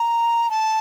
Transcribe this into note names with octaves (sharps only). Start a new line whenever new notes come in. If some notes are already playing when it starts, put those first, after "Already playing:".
Already playing: A#5
A5